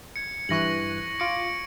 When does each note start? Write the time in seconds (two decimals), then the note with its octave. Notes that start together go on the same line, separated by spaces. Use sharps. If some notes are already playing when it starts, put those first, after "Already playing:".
0.16 G#6 C#7
0.49 G2 E3 C#6 F#6 A#6 F#7
1.20 F4 D6 C#7 D7